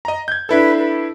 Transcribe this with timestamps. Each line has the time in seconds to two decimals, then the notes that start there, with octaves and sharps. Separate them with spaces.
0.05 D#5 A#5
0.28 G6 G#6
0.49 D4 E4 A4 B4
0.78 B4